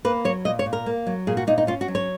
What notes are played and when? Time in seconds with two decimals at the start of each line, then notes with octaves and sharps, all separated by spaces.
0.05 A#3 B4
0.24 F#3 C#5
0.45 A#2 D#5
0.59 C#5
0.66 A#2
0.73 A#4
0.86 A#3
1.07 F#3
1.27 A#2 G#4
1.37 F#4
1.47 A#2 D#4
1.58 D#4
1.67 C#4 F4
1.81 F#4
1.88 F#3
1.95 C#5